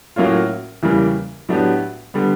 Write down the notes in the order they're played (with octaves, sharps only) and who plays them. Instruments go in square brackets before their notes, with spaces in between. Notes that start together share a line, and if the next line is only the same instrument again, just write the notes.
[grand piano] A2 F#3 A#3 C#4 F4
E2 C#3 E3 G3 A#3
A2 F#3 B3 D4 G4
D3 G3 B3